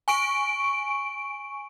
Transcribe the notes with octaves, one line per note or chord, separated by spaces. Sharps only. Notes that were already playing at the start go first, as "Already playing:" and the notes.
G#5 C#6 D7